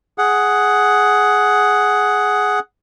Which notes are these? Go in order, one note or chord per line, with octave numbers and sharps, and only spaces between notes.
G#4 F#5